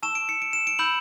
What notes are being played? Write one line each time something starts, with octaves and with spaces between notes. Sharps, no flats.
A5 C#6 E6 E7
D7
C#7
D7
E7
D7
B5 E6 G6 F#7